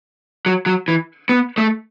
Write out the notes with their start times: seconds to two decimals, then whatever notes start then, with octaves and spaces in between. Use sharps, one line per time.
0.46 F#3
0.66 F#3
0.88 E3
1.29 B3
1.58 A3